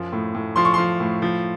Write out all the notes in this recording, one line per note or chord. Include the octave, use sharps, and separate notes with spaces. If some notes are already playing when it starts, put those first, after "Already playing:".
Already playing: F#2 F3
A2
A2
F3 C6
C#6
F3 C6
A2
F3